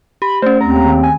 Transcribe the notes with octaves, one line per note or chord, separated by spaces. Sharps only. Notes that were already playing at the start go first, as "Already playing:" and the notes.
G4 B5
A3 C#4 C5
D#2 C4 A#5
D#3
G#5